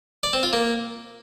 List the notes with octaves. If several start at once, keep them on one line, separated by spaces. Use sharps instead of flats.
D5
C4
F4
A#3